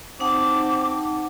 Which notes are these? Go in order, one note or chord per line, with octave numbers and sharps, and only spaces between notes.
C4 D#4 F#5 A5 D6